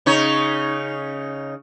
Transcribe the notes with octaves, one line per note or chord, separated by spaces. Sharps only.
C#3 D#4 C#5